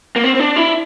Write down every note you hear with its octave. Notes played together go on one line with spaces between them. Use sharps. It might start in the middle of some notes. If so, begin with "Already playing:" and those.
A#3
C4
C4
D4
E4